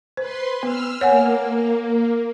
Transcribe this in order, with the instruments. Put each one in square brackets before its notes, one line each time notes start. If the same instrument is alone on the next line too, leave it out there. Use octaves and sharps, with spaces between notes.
[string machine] B4 C6 [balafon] C5
[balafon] B3 [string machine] E6 F6
[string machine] A#3 [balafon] C#5 F#5 G#5